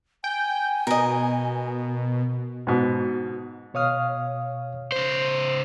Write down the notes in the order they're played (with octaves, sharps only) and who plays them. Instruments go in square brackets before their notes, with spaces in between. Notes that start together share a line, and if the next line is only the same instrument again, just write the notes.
[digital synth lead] G5 [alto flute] G#5
[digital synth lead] B2 [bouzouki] A#4 D#5
[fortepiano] G#2 B2
[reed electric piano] B2 C#5 F5 D#6 F6
[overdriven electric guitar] C#3 C5